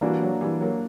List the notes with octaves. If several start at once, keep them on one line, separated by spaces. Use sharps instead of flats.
E3 G3 A#3 D4 F#4
F#3
E3 G3
F#3 A#3